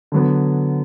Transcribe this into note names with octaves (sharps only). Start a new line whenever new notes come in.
D3 F#3 B3